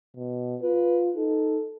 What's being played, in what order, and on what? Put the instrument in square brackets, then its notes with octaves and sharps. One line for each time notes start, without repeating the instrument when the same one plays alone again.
[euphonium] B2
[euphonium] F4 [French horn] B4
[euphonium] D#4 [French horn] A4